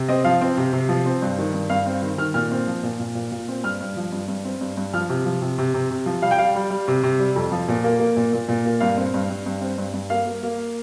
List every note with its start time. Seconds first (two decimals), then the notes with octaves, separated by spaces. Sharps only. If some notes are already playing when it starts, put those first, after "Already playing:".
Already playing: C3
0.08 C4 D#5
0.24 F3 F5
0.41 C4
0.57 C3
0.73 C3
0.89 F3
1.06 C4
1.22 G2
1.38 D#3
1.54 G2
1.69 G2 F5
1.86 C4
2.02 D#3
2.18 D#3 F6
2.34 A#2 F6
2.51 C4
2.67 F3
2.83 A#2
2.99 A#2
3.15 A#2
3.32 A#2
3.48 C4
3.64 G2 F6
3.81 G2
3.97 F3
4.12 G2
4.28 G2
4.44 C4
4.61 G2
4.77 G2
4.94 F3 F6
5.09 C3
5.25 F3
5.42 C3
5.58 C3
5.74 C3
5.91 C3
6.06 F3
6.22 G3 F5
6.31 G5
6.38 G3 F5
6.55 G3
6.70 G3
6.88 C3
7.03 C3
7.19 G3
7.36 F2
7.52 F3
7.68 A#2
7.84 A#3
8.00 A#3
8.17 A#2
8.33 A#2
8.49 A#2
8.65 A#3
8.80 G2 F5
8.97 C4
9.14 G2
9.30 G2
9.46 G2
9.61 C4
9.78 G2
9.93 G2
10.10 A#3 F5
10.27 A#3
10.43 A#3